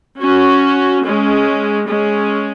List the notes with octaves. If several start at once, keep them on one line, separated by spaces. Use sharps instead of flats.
C#4 F#4
G#3 C#4
G#3 C#4